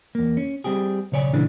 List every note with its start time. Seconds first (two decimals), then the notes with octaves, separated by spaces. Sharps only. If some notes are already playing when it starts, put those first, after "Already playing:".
0.15 E2 A#3
0.37 C#4
0.64 G3 C4 G4 G#4
1.12 B1 C#3 C#5 D5 G#5
1.34 A#2 C#3 E3 G#3 D4